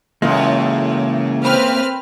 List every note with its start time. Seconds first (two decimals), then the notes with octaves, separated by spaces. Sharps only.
0.22 F#2 A2 C#3 E3 G#3 A#3 F4
1.44 C4 B4 F6